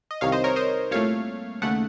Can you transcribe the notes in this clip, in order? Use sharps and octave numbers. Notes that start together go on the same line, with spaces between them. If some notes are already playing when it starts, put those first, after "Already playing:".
D#5
C2 C3 D#3 C#5 F5
C5 D#5
A#4 C#5
C5 D#5
C2 A#2 A3 C#5 F5
D#2 C#3 A3 F#5